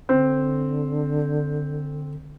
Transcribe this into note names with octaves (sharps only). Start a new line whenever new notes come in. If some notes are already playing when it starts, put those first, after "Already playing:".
D3 C4